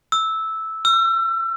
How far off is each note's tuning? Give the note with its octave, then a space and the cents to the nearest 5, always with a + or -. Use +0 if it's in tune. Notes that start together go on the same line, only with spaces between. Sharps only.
E6 -10
E6 +35